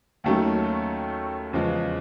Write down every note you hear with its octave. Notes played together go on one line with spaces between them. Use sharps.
D#2 D#3 F#3 A3 C#4
E2 C#3 F3 G#3